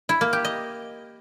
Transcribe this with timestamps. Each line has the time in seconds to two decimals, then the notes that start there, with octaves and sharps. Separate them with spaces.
0.09 E4
0.21 A#3
0.33 G4
0.45 D#5